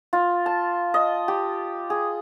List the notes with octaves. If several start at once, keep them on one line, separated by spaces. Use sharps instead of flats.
F4
A5
D#5
G4
G#4